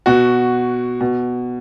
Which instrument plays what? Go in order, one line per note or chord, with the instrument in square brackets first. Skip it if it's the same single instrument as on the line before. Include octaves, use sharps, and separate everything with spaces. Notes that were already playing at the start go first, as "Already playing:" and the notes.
[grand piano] B2 F#4
B2